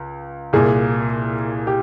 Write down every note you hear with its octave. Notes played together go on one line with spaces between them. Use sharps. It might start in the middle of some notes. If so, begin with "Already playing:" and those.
Already playing: C#2
C2 A#2 G#4
G4